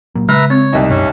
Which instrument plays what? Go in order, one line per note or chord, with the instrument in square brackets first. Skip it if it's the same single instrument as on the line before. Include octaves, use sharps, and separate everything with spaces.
[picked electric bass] A#2 F#3 A#3
[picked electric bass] C#3 [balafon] G#3 [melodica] B4 E5 A#5
[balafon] C4 [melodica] C#5
[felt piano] C2 G3 D#4
[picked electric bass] F#2 B2 [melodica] C#4